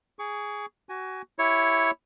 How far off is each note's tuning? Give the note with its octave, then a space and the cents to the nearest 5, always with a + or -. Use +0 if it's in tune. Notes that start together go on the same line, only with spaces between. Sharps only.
G#4 +0 C#6 +30
F#4 +25 G#5 +0
E4 +0 G4 +0 C#5 +0